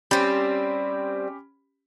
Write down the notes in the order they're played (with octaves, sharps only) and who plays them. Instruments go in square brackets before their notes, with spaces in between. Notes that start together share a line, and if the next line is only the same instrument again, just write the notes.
[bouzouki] G3 C4 [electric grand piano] C#4 G4 B5